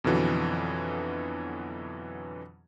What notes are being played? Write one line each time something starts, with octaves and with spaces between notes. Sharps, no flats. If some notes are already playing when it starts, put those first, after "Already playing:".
F2 B2 D3 E3 F#3